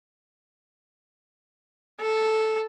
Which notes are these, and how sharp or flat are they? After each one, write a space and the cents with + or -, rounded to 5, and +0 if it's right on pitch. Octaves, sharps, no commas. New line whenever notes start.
A4 -5